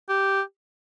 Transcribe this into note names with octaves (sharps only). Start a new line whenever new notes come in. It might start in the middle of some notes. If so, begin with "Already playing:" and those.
G4